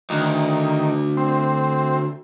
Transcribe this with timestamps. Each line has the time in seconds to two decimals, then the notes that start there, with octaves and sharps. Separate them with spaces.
0.10 D2 D#3
1.17 C4